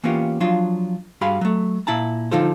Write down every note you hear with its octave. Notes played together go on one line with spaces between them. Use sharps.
E3 A#3 B3 C#4 F4 G4
F3 F#3 D4 F4
G2 F#4 G#4 F5 B5 C6
F#3 A3
A#2 E4 A5 A#5
D3 F3 D#4 F4 A4 C5